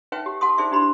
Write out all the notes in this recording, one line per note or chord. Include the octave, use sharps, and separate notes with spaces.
D#4 B4 C#5 E5 F#5 G5
G4
G4 F#5 A5 C6 D#6
D#4 G#4 C5 D5 E5
D4 E4 G4 C5 B5 C6